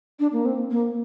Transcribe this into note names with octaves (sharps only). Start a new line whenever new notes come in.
D4
A#3
C4
A#3